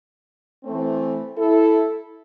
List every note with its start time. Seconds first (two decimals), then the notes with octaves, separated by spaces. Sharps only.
0.64 E3 A3 C4
1.37 E4 A4